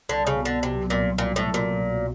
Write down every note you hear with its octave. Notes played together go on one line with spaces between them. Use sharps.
C2 D3
C#3
B2
D3
C3 F#3
C2 A#2
C2 A#2
A2
B2
A#2
F#3